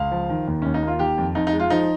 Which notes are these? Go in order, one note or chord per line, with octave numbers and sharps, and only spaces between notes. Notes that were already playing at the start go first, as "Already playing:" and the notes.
Already playing: C#2 F5
F3
D#3
D#2
D#2 C#4
D#4
A#3 F4
D#3 G4
F2
F2 D#4
D#4
G#3
F4
F3 D#4